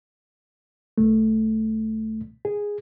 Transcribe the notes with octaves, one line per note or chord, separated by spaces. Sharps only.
C2 A3
G#4